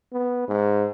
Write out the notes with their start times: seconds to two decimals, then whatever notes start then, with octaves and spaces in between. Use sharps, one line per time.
0.13 B3
0.48 G#2